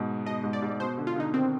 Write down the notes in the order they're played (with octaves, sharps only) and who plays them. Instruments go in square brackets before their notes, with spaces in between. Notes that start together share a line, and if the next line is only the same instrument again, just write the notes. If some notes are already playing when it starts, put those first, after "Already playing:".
Already playing: [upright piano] G#2 B2
[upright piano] B2 [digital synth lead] D#5
[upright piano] G#2
[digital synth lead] D5
[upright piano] G#2
[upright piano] B2 [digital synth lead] C5
[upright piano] D3
[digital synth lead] F4
[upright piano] D3 [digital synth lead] D#4
[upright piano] D#3 [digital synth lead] C4